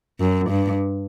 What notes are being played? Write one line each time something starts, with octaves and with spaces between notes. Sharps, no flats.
F#2
G2